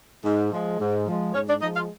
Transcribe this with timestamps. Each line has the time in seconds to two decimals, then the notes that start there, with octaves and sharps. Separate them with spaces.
0.24 G#2
0.51 F3 G#3
0.79 G#2
1.07 F3 G#3
1.34 G#2 C#4 C#5
1.48 D4 D5
1.61 F3 G#3 D#4 D#5
1.75 F4 F5